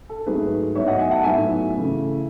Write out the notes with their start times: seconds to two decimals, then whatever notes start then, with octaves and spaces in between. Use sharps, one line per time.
0.09 A4
0.26 G#2 F#3 A3 D#4 G#4 B4
0.75 A2 F#3 B3 D#4 C#5 E5
0.87 D#5 F#5
0.99 E5 G#5
1.11 F#5 A5
1.24 A2 F#3 B3 D#4 E5 G#5
1.73 C#3 E3 A3